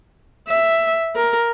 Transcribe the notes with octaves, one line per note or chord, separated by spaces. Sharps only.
E5
A#4